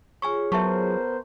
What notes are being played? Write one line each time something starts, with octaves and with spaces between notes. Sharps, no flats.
F4 G#4 C#5 G#5 C#6
F#3 B3 A#4 C5 E5 A5 C#6